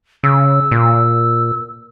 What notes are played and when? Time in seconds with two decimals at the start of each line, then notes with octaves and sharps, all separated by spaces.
0.24 C#3 E6
0.71 A#2